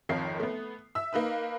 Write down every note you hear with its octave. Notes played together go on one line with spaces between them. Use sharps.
G#1 F2 D#3 F3 C#5 C7
A3 B3
E5 E6
A#3 D#4 B4 E6